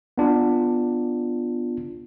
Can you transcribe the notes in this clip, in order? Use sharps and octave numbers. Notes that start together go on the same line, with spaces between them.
B3 D4 F4